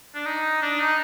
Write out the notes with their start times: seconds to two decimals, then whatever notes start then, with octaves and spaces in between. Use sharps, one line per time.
0.14 D4
0.26 D#4
0.62 D4
0.80 D#4